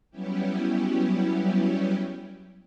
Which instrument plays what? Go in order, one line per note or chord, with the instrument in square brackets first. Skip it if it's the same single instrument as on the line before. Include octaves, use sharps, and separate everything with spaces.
[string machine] F#3 G3 B3 C#4 E4 G4